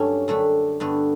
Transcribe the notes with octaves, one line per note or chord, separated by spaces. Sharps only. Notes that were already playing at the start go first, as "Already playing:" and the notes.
Already playing: G2 F#3 A3 C#4
F#2 D3 G3 A3
G2 D3 A3 B3